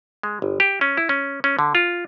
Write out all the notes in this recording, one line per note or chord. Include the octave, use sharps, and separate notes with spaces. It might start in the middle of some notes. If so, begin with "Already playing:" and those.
G#3
G1
G4
C#4
E4
C#4
C#4
D3
F4